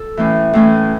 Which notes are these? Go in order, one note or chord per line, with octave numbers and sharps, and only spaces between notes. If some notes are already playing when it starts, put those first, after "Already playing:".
Already playing: A4
A2 E3 A3 C#4
A2 E3 A3 C#4